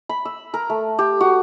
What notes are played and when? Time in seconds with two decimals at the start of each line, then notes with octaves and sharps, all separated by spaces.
0.09 B5
0.25 E6
0.54 A#4
0.70 A3
0.99 G4
1.21 F#4